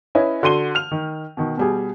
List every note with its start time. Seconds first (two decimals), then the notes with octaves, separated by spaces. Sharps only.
0.15 C#4 E4 B4 D#5
0.43 D3 F#4 C6 D#7 G7
0.75 F6 F7
0.92 D#3
1.37 B2 D#3
1.57 B2 G3 G#4